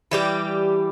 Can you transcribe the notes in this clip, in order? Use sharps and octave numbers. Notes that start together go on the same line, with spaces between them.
E3 G3 G4